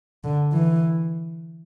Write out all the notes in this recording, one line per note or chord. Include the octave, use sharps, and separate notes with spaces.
D3
E3